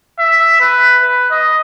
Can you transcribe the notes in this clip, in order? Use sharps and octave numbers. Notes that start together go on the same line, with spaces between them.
E5
B4
B4
D#5